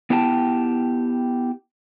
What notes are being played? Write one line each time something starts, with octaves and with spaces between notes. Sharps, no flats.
B3 E4 G4 G5 A5